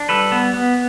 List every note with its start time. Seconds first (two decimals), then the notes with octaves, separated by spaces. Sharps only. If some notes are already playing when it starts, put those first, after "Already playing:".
Already playing: D4
0.09 G3 A4 B4
0.32 B3
0.54 B3